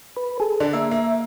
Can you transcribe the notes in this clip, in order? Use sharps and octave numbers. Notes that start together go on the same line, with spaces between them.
B4
G#4 A4
D3 D4
A#3 E5
A#3